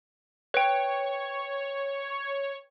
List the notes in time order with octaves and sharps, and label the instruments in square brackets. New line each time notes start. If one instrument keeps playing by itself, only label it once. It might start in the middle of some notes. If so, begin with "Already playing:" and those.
[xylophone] B4 G5 [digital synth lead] C#5